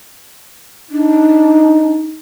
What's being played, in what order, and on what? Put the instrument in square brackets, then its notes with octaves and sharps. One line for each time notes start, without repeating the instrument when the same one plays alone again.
[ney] D4 [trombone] D#4